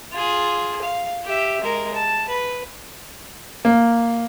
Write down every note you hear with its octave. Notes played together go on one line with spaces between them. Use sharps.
F4 G#4
F5
G4 E5
G#3 A#4
A5
B4
A#3